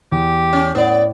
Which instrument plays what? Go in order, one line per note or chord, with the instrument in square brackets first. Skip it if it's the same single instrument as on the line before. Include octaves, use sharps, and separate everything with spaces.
[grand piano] E2 [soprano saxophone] G4
[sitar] C#4
[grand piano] A2 [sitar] B3 D5